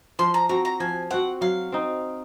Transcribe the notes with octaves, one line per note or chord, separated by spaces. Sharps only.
F3 C6
A#5
C4 F#4 A#5
A#5
F3 G#5
C4 F#4 F#5
F#3 F5
C4 D#4